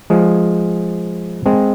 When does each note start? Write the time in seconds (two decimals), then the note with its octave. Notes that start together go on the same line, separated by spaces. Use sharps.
0.10 F3 G#3
1.46 G#3 C4